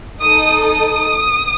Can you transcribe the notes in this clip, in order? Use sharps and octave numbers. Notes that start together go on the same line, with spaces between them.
D#4 A4 D#6
D#6